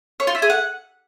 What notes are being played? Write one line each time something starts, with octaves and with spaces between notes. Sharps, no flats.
C#5
F4
E4
G#4
F#5